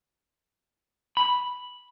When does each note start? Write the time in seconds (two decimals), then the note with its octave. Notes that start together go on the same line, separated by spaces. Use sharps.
1.17 B5